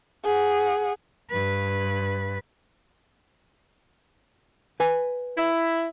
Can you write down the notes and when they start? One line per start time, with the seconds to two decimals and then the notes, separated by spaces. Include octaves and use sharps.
0.24 G#4 F#5
1.30 G2 B4
4.80 B4 G#5
5.38 E4